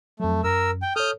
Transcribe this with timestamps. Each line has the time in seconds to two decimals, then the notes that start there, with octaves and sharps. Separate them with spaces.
0.20 F2 F#3 A3
0.44 F#2 A#4 E6
0.82 G5
0.96 A4 C#5 D#6 F6 G6